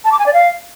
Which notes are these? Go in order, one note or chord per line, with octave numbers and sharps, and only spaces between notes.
A5
D6
G#5
D5
F5